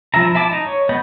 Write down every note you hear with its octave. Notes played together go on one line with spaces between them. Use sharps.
F3 E4 E5 A#5
E4 E5 A5 D6
D#4 D#5
C#5
B3 D#5 B5 G6